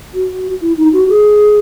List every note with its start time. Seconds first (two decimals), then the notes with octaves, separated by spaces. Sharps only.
0.14 F#4
0.62 E4
0.77 D#4
0.93 F#4
1.09 G#4